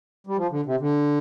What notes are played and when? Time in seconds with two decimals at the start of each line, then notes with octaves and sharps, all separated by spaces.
0.27 G3
0.37 F3
0.51 D3
0.66 C3
0.80 D3